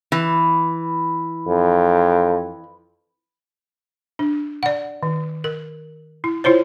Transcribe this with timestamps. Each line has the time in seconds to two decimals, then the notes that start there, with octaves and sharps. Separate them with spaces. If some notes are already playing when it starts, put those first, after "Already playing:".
0.12 E3
1.47 F2
4.19 D4
4.63 D5 F#5
5.03 D#3
5.44 A#4
6.24 E4
6.44 E4 F4 C5 C#5